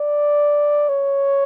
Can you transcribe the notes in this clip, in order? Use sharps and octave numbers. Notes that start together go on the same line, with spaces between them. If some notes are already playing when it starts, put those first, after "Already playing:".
Already playing: D5
C#5